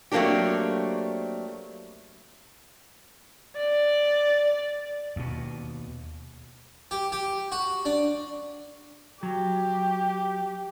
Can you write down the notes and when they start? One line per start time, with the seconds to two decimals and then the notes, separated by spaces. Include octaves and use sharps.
0.12 F#3 A3 A#3 C4 D4 G4
3.57 D5
5.16 D#2 B2
6.91 G4
7.12 G4
7.52 F#4
7.85 D4
9.23 F#3 G4